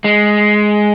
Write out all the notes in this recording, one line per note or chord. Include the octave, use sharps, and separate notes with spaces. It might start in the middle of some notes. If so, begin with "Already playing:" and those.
G#3